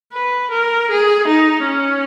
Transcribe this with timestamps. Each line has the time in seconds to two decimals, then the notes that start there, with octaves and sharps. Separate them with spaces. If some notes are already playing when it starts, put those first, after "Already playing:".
0.13 B4
0.51 A#4
0.90 G#4
1.28 D#4
1.68 C#4